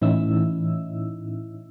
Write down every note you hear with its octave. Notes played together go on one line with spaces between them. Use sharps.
A2 E3 C#4 D#4 E4 E6